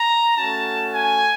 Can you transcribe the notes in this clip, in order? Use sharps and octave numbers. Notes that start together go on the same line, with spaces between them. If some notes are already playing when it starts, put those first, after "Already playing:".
Already playing: A#5
A3 C#4 F#4 A5
G#5